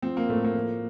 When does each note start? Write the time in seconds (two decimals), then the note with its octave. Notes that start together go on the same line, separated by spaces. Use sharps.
0.02 F3 C4
0.17 A#3
0.29 A2 A3
0.44 A#3
0.55 F3